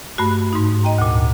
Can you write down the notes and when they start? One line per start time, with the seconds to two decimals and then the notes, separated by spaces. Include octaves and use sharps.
0.18 G2 A3 F#4
0.53 G#2 D#4
0.83 D#5 G5 A#5
0.98 D2 A#2